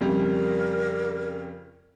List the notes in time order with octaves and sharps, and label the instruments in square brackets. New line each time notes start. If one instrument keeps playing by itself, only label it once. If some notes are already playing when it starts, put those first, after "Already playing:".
[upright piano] F2 C#3 G3 [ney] A#4